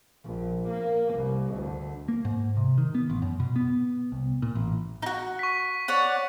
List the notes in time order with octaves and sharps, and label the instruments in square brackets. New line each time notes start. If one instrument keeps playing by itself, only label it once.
[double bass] A#1
A#3
C2
D2
[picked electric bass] A#3
G#2
C3
D#3
B3
A1
F#2
B2
B3
C2
A#2
A1
[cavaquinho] D#4 F#4
[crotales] C#6 B6
[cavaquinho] C#5 D5 F#5